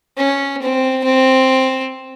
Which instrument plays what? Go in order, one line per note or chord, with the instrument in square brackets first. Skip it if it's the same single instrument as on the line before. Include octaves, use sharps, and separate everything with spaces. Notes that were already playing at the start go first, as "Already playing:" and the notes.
[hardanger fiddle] C#4
C4
C4